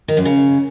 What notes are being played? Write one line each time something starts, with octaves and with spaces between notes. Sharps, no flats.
D#3
F#2
C#3